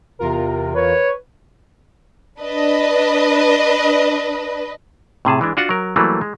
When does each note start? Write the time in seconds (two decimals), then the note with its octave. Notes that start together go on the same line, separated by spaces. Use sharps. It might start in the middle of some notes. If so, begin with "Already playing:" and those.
0.19 E2 C3 F4 A#4
0.75 B4 C#5
2.39 D4 B4 D#5
5.25 A2 C3 G#4 A5
5.41 E3 G#3 D4
5.57 D4 F4 F#4 F#5
5.69 F#3 A#4
5.96 E3 F#3 G3 A3 A#3
6.21 G#3